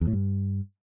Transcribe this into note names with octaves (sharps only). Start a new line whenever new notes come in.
E2
A2
G2